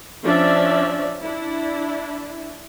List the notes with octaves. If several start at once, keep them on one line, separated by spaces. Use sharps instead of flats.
F3 C#4 D4 D5 E5
D4 E4